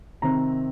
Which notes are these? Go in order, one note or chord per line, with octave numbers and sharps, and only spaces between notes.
C3 D#3 C4 A#5